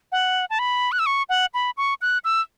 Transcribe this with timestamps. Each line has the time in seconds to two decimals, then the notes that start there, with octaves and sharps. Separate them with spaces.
0.12 F#5
0.50 A5
0.59 B5
0.92 F#6
0.99 E6
1.06 C#6
1.29 F#5
1.54 B5
1.77 C#6
2.01 F#6
2.24 E6